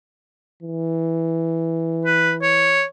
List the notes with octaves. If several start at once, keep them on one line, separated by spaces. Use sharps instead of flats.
E3
B4
C#5